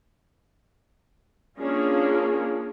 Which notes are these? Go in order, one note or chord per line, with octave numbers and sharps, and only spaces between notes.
A#3 C#4 D4 F4 G#4